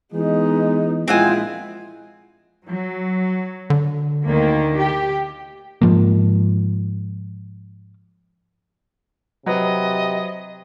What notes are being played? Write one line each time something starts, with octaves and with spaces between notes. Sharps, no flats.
E3 G#3 B3 D#4
A#1 G#3 C4 E4 F4 F#5 G#5
F#3
D3
D2 D#3 A#3
G4
G#2 F3 A#3
C3 F#3 F#4 B4 D#5